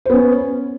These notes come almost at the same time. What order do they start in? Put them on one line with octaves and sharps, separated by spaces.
C5 B3 C#4